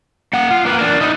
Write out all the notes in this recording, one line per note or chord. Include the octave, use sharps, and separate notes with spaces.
A#3 F#5
F4
A#3 B4
D4 A#4
D#4 E4